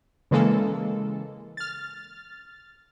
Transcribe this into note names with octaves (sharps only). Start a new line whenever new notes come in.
C#3 E3 G#3 A#3 A4
F6 A6